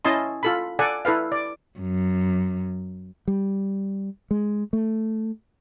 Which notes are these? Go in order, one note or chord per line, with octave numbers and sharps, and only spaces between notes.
C#4 E4 D#5 A5 C6
F4 A4 B5
A4 D5 F#5 G#5
E4 A4 B4 F5
D5
F#2
G3
G#3
A3